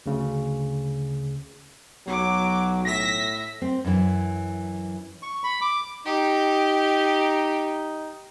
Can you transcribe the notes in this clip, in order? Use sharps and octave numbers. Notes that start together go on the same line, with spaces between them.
D2 C#3
B1 F#3 D6
A2 E5 A#6 B6
C4
F#2 E3
C#6
B5
D6
D#4 G4